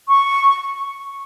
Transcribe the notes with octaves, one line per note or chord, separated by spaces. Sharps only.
C#6